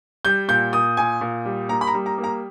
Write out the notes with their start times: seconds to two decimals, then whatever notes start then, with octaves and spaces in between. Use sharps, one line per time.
0.25 G3 G6
0.48 A#2 G6
0.72 A#2 D#6
0.97 A#2 G#5
1.21 A#2
1.45 G3
1.69 A#3 A#5
1.81 B5
1.87 A#5
1.94 G3
2.06 A#5
2.18 A#3
2.24 A#5